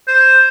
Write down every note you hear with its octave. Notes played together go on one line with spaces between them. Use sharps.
C5